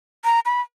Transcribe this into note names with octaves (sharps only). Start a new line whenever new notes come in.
A#5
B5